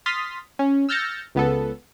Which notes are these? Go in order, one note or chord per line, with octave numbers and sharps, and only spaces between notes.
C6 D#6 F6 A6 B6
C#4
E6 F6 G6 A6 A#6 C#7
C#2 B3 A4